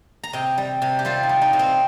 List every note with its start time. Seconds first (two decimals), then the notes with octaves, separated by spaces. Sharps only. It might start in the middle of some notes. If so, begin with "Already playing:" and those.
0.24 A#5
0.33 C3 D#5 G5
0.58 G3
0.82 C3
0.99 G4
1.05 G3 C4 F4
1.23 D#4
1.29 G3
1.41 D#4
1.53 C3
1.59 C4